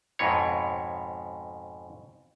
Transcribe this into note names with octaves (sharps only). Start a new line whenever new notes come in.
F2 G#2 B2 C#5